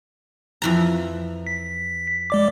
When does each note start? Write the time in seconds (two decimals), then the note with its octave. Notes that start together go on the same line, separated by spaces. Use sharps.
0.62 F2 E3 A#5
1.47 B6
2.30 G#3 D5 D6